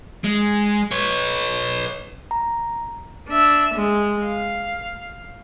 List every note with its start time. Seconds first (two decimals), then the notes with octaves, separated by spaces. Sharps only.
0.24 G#3
0.91 B4 C#5
2.31 A#5
3.28 D4 E5
3.74 G#3
4.25 F5